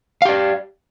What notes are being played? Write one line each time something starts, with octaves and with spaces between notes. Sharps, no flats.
G4 D5 F5